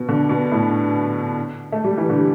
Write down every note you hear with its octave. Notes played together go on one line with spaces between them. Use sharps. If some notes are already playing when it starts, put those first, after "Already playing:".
Already playing: B2
D3
B2
A2
A3
G3
E3
D3